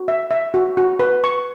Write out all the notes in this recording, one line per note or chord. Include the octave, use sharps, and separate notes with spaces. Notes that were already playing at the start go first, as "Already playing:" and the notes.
Already playing: F#4
E5
E5
F#4
F#4
B4
C#6